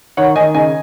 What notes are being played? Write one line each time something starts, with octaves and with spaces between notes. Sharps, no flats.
D#3 C#5 F#5
D#3 D#5 G#5
C#3 D#5 G#5